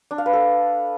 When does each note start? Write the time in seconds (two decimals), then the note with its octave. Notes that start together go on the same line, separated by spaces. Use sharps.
0.11 D4
0.18 F5
0.26 B4
0.33 A4